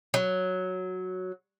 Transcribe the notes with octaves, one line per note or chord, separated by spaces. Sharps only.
F#3